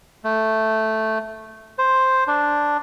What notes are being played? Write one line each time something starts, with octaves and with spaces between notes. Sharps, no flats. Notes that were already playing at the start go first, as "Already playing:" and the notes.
A3
C5
D4